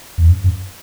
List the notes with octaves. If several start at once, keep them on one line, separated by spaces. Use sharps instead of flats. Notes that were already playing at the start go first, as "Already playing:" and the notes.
E2
F#2
F#2